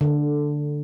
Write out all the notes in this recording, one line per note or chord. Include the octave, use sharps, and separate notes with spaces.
D3